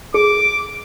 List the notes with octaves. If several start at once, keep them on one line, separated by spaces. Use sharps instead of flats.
G#4 D6